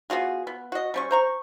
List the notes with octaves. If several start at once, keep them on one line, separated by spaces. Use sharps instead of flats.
B3 F4 F#4 G#4
B3
F#4 D#5
G3 C#4 C#6
C5 A#5 C#6